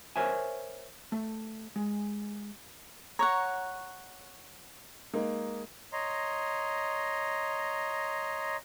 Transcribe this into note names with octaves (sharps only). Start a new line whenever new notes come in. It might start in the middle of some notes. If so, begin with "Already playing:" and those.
A#4 C5 C#5 E5 G#5
A3
G#3
C#5 F#5 A#5 C#6
G#3 A#3 D#4
C#5 D#5 A#5 C6